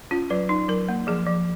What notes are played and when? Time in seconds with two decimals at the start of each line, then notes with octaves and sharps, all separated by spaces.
0.11 C#4 F4
0.30 F#3 B4
0.49 D#4
0.68 F#3 A#4
0.89 A#3
1.07 F3 G#4
1.27 F3